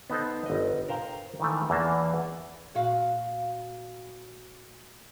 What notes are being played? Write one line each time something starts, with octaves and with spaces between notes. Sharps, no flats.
B3 D#4 A4 C5
G1 D#5
A#4 C5 F5 G5 A#5
D#3 E3 A3
E2 E3 A#3 A5
A#2 F#4 F5